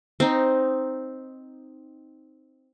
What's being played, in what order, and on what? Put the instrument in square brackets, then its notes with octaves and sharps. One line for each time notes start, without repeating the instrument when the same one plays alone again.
[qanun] C4 D#4